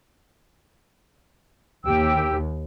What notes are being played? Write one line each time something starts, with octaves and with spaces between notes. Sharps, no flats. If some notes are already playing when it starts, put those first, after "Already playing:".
D#2 G4 G5 E6